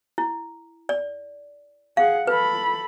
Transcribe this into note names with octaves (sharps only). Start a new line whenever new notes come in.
E4
D5
G#4 F5 F#5
A4 B4 B5